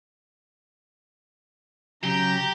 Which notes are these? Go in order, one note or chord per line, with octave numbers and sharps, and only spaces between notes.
C#3 F#3 G4 A#5 G6